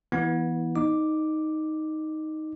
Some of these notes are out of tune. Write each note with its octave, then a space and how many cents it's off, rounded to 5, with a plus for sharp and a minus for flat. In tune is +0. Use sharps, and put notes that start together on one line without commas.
E3 +0 B3 -25 E4 -15
D#4 +5 D#5 -25 D6 +0